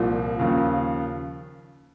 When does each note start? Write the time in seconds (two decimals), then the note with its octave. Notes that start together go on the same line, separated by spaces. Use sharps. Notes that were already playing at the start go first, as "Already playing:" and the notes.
Already playing: C2 A#2 F3
0.39 D#2 C#3 F3